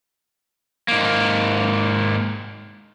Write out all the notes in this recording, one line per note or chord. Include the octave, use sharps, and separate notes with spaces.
G#2 A#3